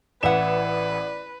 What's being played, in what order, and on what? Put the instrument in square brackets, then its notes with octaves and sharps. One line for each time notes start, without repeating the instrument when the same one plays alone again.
[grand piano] A1 E3 E7 [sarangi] B4 [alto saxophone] D5 [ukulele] E5 F#5